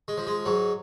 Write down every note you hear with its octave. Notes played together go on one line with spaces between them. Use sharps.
G#3
F3
G#3
G#2 F#3